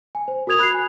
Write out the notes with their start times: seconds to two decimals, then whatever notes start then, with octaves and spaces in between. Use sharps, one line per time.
0.15 G#5
0.28 C5
0.47 F#4 A#4 D#6 G#6 F7
0.59 B5 F#6 G#6 C7
0.74 G#5